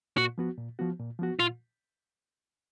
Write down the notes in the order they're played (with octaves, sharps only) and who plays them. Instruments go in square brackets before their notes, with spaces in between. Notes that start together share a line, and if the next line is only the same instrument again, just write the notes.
[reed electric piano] A#2 [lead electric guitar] F#4
[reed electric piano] F3 B3 F#4
A#2
F3 B3 F#4
A#2
F3 B3 F#4
[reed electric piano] A#2 [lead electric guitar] F4